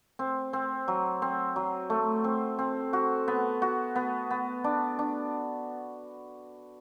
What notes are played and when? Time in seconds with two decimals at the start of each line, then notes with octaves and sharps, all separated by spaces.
0.19 C4
0.53 C4
0.88 F#3
1.22 C4
1.56 F#3
1.90 A3
2.24 C4
2.59 C4
2.93 F#4
3.28 B3
3.62 F#4
3.96 B3
4.31 B3
4.64 D4
4.99 D4